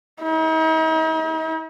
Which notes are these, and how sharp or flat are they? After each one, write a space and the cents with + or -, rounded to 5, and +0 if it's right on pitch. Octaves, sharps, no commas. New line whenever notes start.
D#4 +45